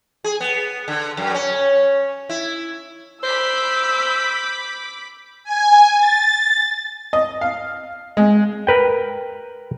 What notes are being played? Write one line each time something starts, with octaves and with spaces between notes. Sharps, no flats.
G#4
B3
D3
F#2
C#4
E4
C5 B5 D6 E6 G6 B6
G#5
A6
D#5
F5
G#3
A#4 B4 G5